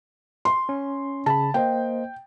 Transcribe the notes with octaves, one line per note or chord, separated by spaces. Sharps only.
C6
C#4
C#3 A5 B5
A#3 C5 D#5 G5